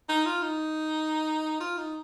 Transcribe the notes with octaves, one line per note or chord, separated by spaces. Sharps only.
D#4
F4
D#4
F4
D#4